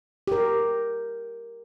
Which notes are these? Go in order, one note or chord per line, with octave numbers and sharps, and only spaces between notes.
G4 A#4